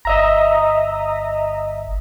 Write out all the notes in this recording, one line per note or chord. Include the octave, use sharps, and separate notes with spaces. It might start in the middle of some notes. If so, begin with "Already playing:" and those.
G1 D#5 E5 A#5